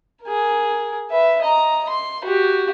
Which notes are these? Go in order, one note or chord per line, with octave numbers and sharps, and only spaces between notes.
G#4 A#4
B4 E5
D#5 A#5
C6
F#4 G4